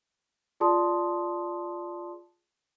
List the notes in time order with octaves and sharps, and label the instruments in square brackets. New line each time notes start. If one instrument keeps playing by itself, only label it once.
[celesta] F4 G#4 D5 A5 C6 D#6